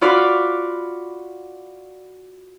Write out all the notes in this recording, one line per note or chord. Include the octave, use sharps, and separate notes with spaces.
F4 F#4 D5 B5 D6 F6